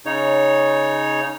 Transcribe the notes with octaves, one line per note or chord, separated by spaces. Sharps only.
C#3 D#4 C#5